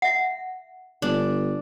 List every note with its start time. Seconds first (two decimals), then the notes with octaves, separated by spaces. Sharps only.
0.02 E5 F#5
1.02 G1 D4